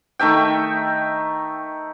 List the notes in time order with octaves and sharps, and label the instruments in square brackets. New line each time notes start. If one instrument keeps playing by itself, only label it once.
[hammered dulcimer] D#3 A3 E5 G5